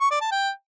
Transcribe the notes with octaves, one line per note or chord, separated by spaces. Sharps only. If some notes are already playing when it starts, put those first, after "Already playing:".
C#6
D5
A5
G5